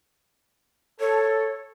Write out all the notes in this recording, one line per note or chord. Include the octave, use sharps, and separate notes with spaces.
A4 C#5